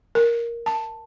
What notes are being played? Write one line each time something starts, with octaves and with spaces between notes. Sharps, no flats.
A#4
A5